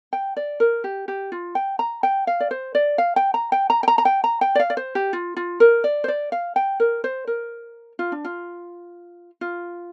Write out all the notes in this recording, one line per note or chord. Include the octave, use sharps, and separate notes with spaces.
G5
D5
A#4
G4
G4
F4
G5
A#5
G5
F5
D5
C5
D5
F5
G5
A#5
G5
A#5
G5
A#5
A#5
G5
A#5
G5
D5
F5
D5
C5
G4
F4
F4
A#4
D5
C5
D5
F5
G5
A#4
C5
A#4
F4
D4
F4
F4